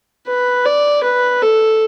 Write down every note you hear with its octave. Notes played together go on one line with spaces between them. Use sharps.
B4
D5
B4
A4